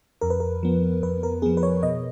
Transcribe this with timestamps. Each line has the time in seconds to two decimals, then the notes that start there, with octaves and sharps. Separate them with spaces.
0.21 F2 A#4
0.30 B4
0.40 A#4
0.63 F3 B3
1.02 F2 B4
1.23 A#4
1.42 F3 B3 G#4
1.57 B4
1.63 C#5
1.83 B2 D#5